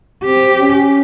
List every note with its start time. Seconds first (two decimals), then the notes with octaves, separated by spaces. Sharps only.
0.25 C4 G4
0.61 C#4